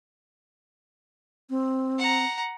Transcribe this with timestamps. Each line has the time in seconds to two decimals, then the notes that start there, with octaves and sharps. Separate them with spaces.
1.50 C4
1.98 F#5 A#5